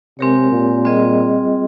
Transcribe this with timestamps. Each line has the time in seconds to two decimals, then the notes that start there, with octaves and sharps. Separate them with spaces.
0.19 C3 G#3 C4 G4 A#4 C#5
0.52 A#2
0.85 G3 C4 F4 G#4 D#5